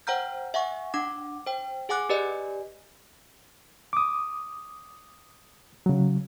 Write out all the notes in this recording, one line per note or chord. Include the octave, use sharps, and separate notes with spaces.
C5 F#5 G5 A#5 F6 G6
E5 F#5 G#5 C#6
D4 F#5 D6
C5 G5
G#4 F#5 G#5 D6 F#6
G4 B4 D5 D#5 G#5
D6 D#6
C#3 F#3